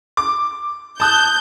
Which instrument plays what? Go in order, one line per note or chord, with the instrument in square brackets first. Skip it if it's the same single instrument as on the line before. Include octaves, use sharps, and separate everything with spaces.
[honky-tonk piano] D6
[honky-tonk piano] A5 D#6 F#6 [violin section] G6